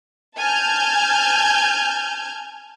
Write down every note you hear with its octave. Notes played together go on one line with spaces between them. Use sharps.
G#5 A5 F6 G6 G#6